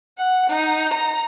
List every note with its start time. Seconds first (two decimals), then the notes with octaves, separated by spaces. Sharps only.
0.17 F#5
0.50 D#4
0.93 A#5